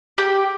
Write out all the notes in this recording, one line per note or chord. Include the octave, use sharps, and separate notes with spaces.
G4